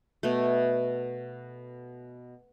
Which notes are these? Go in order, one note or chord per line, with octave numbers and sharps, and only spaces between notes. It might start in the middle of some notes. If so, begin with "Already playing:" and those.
B2 A3